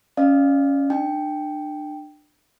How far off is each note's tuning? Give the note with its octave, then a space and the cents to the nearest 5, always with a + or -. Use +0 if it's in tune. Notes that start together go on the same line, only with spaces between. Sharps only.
C#4 +5 D5 +45 F5 +0
D4 +30 G5 +0